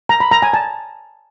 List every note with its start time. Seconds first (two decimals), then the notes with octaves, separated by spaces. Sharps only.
0.09 A#5
0.20 B5
0.31 A#5
0.42 G#5
0.54 A5